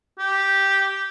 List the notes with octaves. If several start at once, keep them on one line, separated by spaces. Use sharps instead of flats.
G4